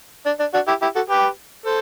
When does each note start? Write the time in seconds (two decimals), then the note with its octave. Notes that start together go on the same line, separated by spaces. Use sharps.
0.26 D4
0.40 D4
0.54 D4 F#4
0.68 E4 G4
0.82 E4 G4
0.95 F#4 A4
1.10 G4 B4
1.65 A4 C5